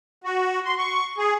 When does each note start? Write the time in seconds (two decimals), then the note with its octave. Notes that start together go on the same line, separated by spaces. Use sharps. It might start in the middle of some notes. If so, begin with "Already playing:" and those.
0.24 F#4
0.65 C6
0.78 C#6
1.18 G#4